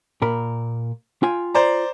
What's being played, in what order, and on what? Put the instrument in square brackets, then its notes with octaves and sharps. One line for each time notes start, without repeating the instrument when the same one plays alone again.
[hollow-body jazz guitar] A#2 A#4 B5
F4 G5 G#5
[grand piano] C5 D5 A#5